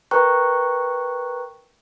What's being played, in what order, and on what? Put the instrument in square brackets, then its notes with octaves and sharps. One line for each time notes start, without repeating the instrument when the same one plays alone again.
[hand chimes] A#4 B4 G5 A#5 C#6 F#6